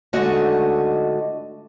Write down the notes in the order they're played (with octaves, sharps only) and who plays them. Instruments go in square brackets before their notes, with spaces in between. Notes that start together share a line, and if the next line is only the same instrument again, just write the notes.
[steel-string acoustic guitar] G#2 D3 A3 F#4 D#5